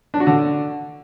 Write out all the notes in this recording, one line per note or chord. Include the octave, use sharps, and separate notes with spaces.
D4
F#4
D3